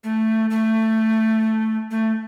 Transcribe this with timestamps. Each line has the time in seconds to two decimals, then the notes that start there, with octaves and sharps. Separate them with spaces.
0.04 A3
0.50 A3
1.91 A3